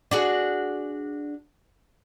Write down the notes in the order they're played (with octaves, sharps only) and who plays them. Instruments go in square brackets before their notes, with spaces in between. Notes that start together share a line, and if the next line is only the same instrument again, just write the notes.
[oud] D4 F#4 G#4